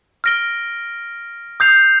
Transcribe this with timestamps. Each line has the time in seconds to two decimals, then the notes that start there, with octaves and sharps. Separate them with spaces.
0.24 F6 A#6 D7 G7
1.60 D#6 G6 C7 F7